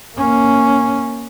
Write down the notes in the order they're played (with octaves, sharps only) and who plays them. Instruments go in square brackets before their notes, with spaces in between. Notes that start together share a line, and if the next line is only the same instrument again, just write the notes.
[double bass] A#3 C#4